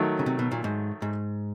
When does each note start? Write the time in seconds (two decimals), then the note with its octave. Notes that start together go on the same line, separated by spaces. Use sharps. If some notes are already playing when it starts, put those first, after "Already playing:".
Already playing: D#3 F#3 A3
0.19 C#3
0.26 C3
0.39 B2
0.52 A#2
0.64 G#2
1.02 G#2